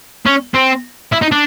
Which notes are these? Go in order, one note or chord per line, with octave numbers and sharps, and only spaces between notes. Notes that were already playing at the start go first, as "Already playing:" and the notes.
C#4
C4
E4
D#4
D4